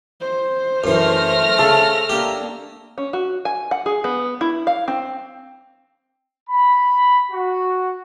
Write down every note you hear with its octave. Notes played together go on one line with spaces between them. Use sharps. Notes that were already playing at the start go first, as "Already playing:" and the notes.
C5
F#2 E3 A3 F6 A#6
C#3 A4
A#3 D4 G4
C#4
F#4
G#5
F#5
G#4
B3
E4
F5
C4
B5
F#4